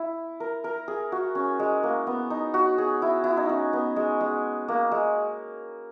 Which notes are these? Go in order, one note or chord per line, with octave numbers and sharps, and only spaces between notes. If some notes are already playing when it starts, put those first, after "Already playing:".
Already playing: E4
A#4
A#4
G#4
F#4
C#4
G#3
A#3
B3
D#4
F#4
G#4
E4
E4
D#4
C#4
B3
G#3
G#3
A#3
G#3